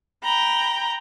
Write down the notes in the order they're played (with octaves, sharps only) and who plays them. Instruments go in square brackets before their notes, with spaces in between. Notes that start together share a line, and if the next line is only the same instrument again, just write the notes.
[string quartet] G5 A#5 B5